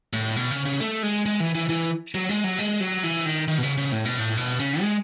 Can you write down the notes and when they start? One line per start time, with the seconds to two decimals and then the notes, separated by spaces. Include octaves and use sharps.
0.13 A2
0.36 B2
0.51 C#3
0.65 C#3
0.80 A3
1.03 G#3
1.26 G#3
1.40 E3
1.55 E3
1.69 E3
2.15 F#3
2.29 G#3
2.44 F#3
2.59 G#3
2.80 F#3
3.03 E3
3.26 D#3
3.48 D#3
3.58 B2
3.63 C#3
3.78 C#3
3.92 A2
4.05 B2
4.19 A2
4.37 B2
4.60 C#3
4.81 G#3